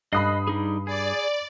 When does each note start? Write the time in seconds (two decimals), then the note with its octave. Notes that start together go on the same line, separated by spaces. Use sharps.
0.13 G2 D#5 B5 D#6 F#6 C7
0.47 G3 D#4 G#4
0.87 G#4 D5